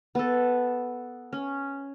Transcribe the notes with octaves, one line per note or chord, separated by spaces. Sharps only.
B3 A4
C#4